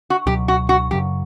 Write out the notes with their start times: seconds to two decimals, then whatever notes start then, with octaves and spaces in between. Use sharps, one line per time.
0.10 F#4
0.26 C#2 B2 F#3 G4
0.48 F#4
0.69 F#4
0.91 F#2 C#3 F#3 G4